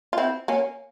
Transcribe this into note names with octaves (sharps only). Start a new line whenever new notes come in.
F4
C4 E4
A#3 C#4